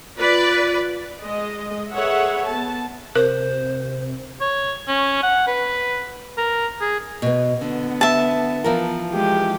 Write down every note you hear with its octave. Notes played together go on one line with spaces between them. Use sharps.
F4 B4 D5
G#3 D#5
G#4 A4 B4 C#5 E5 F#5
B3 A5
C3 A#4 C5
C#5
C#4
F#5
B4
A#4
G#4
B2 B3
D3 B3
E5 A5
E3 F3 A#4
G#3 G4